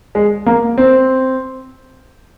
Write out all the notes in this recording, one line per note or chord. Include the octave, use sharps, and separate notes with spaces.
G#3
A#3
C4